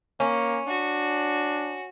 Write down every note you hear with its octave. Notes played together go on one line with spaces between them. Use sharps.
A#3 C#4
D4 F#4